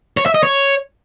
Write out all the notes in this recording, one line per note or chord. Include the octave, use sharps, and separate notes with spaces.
C#5
E5
D#5
C#5